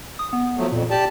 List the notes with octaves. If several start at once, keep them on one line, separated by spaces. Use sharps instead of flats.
D#6
B3
F3 F#3 A3
F2 A#2
G4 D5 A5